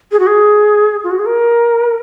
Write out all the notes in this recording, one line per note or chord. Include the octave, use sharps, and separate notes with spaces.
G#4
F#4
G#4
F4
F#4
G#4
A#4